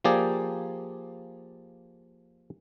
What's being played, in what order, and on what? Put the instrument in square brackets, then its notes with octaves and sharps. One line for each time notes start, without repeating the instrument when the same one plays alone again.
[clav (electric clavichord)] F3 A#3 G4 G#4 D5